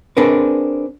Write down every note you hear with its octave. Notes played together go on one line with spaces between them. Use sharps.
C4 D4 G#4 A#4 B4